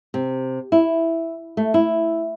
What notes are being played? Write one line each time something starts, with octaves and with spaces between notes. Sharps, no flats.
C3
E4
A3
E4